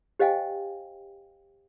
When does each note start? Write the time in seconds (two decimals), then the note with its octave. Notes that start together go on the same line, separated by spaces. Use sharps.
0.19 G4 C5 D#5 F5 G5 G#5